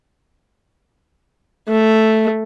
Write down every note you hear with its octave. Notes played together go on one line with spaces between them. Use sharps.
A3